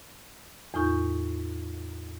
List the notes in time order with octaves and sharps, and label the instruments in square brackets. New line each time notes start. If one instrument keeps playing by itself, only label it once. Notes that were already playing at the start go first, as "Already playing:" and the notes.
[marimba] E2 A2 D#4 F4 C#6 G6